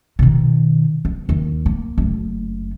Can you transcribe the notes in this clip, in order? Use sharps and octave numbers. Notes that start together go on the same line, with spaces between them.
B2 D#3
B3
D#2
A#3
F#1 A3